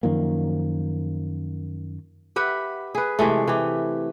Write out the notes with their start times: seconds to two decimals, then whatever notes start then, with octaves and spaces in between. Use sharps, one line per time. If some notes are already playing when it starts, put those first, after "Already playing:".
0.03 F#2 D#3 F3 A#3
2.36 G4 B4 E5 F#5
2.95 G#4 B4
3.19 C3 E3 G#3 A3
3.48 E3 G4